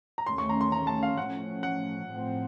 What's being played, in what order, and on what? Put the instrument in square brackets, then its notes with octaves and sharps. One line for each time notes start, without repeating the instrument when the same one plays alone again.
[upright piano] A#5
[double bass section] D#2 D#3 A3 C#4 [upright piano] C6
[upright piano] C#6
A#5
C6
A#5
A5
F5
[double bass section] A2 F3 A3 C#4 [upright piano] F#5
[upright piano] F#5
[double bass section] A2 F3 C4